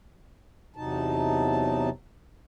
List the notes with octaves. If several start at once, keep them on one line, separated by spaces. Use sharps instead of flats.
E2 C3 F#3 D#4 A5